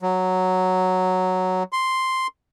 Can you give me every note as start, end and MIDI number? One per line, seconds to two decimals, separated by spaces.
0.02 1.63 54
1.72 2.27 84